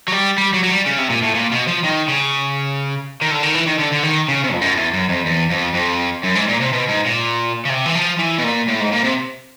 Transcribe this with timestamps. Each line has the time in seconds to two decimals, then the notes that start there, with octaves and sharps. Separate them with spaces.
0.08 F#3
0.12 G3
0.38 G3
0.54 F#3
0.64 F#3
0.69 G3
0.86 C#3
0.98 C3
1.10 A#2
1.22 A2
1.35 A#2
1.52 B2
1.67 F3
1.84 D#3
2.08 C#3
3.22 D#3
3.31 D3
3.43 D#3
3.55 E3
3.67 D#3
3.79 D3
3.92 D3
4.03 D#3
4.29 C#3
4.44 C3
4.52 F2
4.61 F#2
4.76 E2
4.93 F#2
5.09 F2
5.26 E2
5.51 F2
5.74 F2
6.23 F#2
6.35 G#2
6.48 A#2
6.61 C3
6.72 B2
6.88 G#2
7.05 A#2
7.65 C#3
7.70 C3
7.86 E3
7.95 F3
8.19 E3
8.38 B2
8.44 A#2
8.68 A2
8.80 G#2
8.92 A#2
9.04 C3